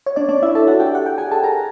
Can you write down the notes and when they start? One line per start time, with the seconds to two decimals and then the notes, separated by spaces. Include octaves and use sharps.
0.06 C#5
0.16 D4 D5
0.29 D4 D5
0.43 E4 E5
0.55 A4 A5
0.67 F#4 F#5
0.80 G4 G5
0.95 F#5
1.06 G5
1.18 G#4 G#5
1.31 A4 A5
1.43 A#4 A#5